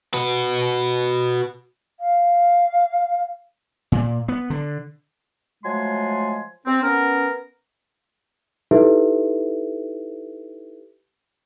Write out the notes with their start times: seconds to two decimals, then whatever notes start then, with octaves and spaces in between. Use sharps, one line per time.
0.14 F#4 B4
1.99 F5
3.92 A#2
4.28 B3
4.50 D3
5.64 F3 F#3 G#3 A3 G#5 C6
6.67 C4
6.83 B3 C#4 A#4
8.71 D#4 E4 G4 A4 B4 E5